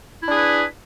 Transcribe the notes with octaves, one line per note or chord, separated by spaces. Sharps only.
D4 E4 G#4 B4